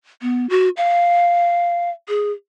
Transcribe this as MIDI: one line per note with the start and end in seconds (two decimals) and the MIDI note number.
0.22 0.49 59
0.50 0.69 66
0.77 1.90 77
2.09 2.32 68